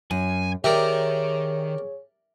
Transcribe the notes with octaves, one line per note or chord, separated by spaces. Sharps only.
F#2 G#5
D#3 G4 G#4 A#4 C#5 D5 E5